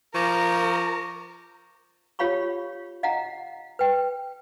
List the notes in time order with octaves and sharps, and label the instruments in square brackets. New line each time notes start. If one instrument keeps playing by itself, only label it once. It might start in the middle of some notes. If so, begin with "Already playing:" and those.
[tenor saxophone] F3 [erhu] A#4 [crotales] C#6 D6 A#6
[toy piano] F4 G4 C#5 F5 B5 C#6
D#5 F5 F#5 A#5
B4 G5